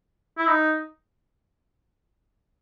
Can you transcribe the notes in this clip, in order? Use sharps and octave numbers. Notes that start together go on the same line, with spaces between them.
E4
D#4